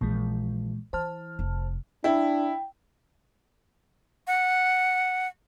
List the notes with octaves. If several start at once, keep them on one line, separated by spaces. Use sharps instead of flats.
A#1 A#2 E3 G#3
E3 C5 A5 F6
F1
D4 E4 G5
F#5